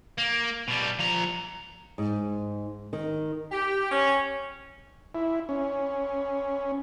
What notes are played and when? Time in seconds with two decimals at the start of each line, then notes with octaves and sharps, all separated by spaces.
0.18 A#3
0.68 B2 G3
0.99 F3 A#5
1.98 G#2
2.93 D#3
3.51 G4
3.91 C#4
5.15 E4
5.49 C#4